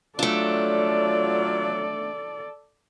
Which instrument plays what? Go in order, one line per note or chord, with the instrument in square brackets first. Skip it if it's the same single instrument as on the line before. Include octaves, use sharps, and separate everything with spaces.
[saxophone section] F#3 F4 [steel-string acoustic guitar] A3 D4 [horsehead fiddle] A4 D5